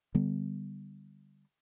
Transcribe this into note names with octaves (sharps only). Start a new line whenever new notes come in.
D3 G3 B3